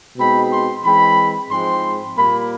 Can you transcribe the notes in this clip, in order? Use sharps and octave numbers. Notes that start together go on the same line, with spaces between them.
B2 G#3 C4 D#4 B5
C6
E3 G#3 C4 B5
G#2 F3 G#3 C4 C6
A#2 G3 A#3 B5